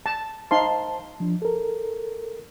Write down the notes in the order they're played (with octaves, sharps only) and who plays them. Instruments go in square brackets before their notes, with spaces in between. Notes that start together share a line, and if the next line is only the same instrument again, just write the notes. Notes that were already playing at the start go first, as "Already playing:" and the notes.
[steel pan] A5
[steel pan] D#4 F5 C6 [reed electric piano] C5 A5
[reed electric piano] F3 D4
A4 A#4